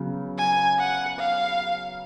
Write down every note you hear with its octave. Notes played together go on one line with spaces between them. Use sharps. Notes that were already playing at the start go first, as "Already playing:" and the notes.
Already playing: C#3 F#3 B3
G#5
F#5
F5